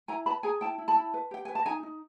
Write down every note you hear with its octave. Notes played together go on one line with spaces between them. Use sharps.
E4 G#5 A#5
B4 A5 B5
G#4 G#5 A#5
E4 G5 A5
E4
A5 B5
E4
B4
G4 G5
B4 G#5
A5
D#4 G#5 A#5
D#4